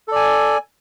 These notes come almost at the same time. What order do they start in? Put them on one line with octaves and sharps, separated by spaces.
A4 D5 G#5